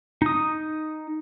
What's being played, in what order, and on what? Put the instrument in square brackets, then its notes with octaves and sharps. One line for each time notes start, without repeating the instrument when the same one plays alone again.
[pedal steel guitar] D#4 D#6